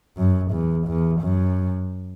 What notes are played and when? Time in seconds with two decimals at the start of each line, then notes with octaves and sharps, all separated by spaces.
0.17 F#2
0.52 E2
0.87 E2
1.21 F#2